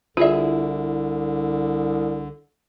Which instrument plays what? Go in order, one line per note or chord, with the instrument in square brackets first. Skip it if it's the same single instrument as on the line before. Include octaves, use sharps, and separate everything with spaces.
[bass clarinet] C2 [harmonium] D3 [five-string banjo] E4 G#4 E5 [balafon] F4 D5